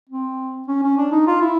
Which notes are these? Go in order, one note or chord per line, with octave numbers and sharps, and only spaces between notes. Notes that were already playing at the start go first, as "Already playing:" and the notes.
C4
C#4
C#4
D4
D#4
F4
E4